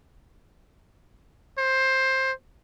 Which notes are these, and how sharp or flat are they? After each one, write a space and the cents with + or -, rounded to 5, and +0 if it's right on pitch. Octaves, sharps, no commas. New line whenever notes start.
C5 +15